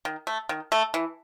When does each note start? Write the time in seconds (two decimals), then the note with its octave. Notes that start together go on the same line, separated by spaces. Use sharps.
0.05 D#3
0.27 A3
0.49 D#3
0.72 A3
0.94 E3